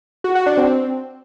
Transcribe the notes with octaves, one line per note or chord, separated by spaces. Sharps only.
F#4
F#4
D4
C4